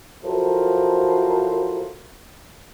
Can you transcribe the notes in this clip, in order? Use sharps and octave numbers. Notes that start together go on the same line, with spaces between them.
F3 F#3 E4 A4 A#4 C5